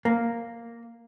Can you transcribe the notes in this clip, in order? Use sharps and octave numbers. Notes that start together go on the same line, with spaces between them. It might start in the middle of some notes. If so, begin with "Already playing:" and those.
A#3